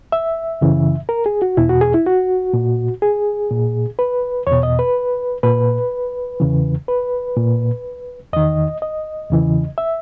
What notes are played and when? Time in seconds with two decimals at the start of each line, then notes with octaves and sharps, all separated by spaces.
0.12 E5
0.61 F#2 C#3 E3
1.09 A#4
1.26 G#4
1.42 F#4
1.57 E2 B2 E4
1.69 F#4
1.81 G#4
1.94 E4
2.06 F#4
2.54 A#2
3.02 G#4
3.51 A#2
3.99 B4
4.47 E2 B2 C#5
4.63 D#5
4.79 B4
5.43 A#2 B4
6.40 E2 C#3 E3
6.88 B4
7.36 A#2
8.32 E2 D#3 D#5
8.82 D#5
9.30 E2 C#3 E3
9.78 E5